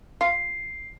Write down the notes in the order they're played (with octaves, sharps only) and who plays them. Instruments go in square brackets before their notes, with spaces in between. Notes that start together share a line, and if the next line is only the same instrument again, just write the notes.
[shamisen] F4 [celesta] C7